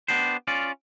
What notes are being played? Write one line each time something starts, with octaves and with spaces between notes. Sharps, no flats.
B3 D4 G4 C5
C#4 F4 D5